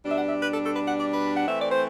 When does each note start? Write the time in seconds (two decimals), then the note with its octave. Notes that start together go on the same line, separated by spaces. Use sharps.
0.05 B2 G3 D4 E5
0.17 F#5
0.29 E5
0.41 B4
0.53 A4
0.64 A4
0.76 B4
0.88 F#5
1.00 D5
1.12 B4
1.37 F#5
1.47 E3 A3 C4 E5
1.59 D5
1.71 C5